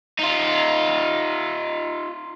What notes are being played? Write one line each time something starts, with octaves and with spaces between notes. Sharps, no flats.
D#4 F4